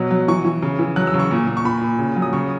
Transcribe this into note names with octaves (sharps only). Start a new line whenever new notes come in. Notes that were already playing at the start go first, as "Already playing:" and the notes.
Already playing: B2 F#3
F#3
E3 C#6
E3
C#3
E3
F#3 F#6
E6
C#3
C#6
A#2
A#2
C#6
A#2 B5
A#2
C#3
F#3
D#6
C#3 C#6